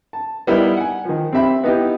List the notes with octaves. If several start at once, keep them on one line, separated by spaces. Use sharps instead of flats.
A5
G3 B3 D#4 E4 A#4
F#5 G#5
D#3 F3
C4 G4 E5 B5
B3 D#4 E4 G4